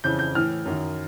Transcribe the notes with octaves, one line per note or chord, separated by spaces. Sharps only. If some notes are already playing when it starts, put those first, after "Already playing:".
F2 C#3 E3 G6
G6
A2 E3 F6
F#2 D#3